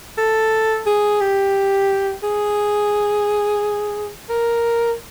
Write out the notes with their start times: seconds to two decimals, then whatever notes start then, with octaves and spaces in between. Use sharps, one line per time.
0.18 A4
0.86 G#4
1.21 G4
2.23 G#4
4.29 A#4